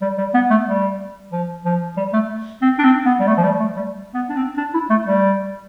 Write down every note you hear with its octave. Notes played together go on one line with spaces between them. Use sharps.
G3
G3
B3
A3
G3
F3
F3
G3
A3
C4
D4
C4
B3
G3
A3
F3
G3
A3
G3
B3
D4
C4
D4
E4
A3
G3